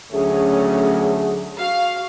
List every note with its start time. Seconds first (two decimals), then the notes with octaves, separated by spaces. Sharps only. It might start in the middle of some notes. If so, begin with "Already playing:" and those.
0.13 D2 F#3 A3 C#4 G#4
1.58 F#4 F5